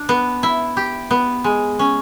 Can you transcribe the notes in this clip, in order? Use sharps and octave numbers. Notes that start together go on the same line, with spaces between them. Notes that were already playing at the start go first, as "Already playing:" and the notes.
Already playing: D4
B3
E4
G4
B3
G#3
C#4